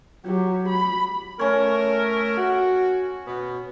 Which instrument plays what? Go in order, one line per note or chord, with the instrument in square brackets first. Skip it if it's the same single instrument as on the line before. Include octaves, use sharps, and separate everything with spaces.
[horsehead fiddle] F#3 G4
B5
[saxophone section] A3 A#4 [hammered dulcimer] C#4 C#5
[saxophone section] F#4
B2 B3